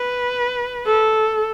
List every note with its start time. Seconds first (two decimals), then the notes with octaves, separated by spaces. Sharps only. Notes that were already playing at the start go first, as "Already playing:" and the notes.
Already playing: B4
0.86 A4